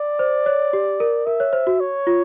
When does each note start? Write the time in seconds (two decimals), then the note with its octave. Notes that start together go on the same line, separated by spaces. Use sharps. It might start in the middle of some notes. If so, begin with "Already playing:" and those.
Already playing: D5
0.19 C5
0.46 C#5
0.73 G4
1.00 A#4
1.26 A#4 E5
1.40 C#5
1.53 C5
1.67 F#4
1.80 C#5
2.07 F4